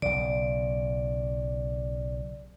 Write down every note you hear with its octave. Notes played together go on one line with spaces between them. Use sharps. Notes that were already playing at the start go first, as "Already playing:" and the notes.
B1 C#3 D5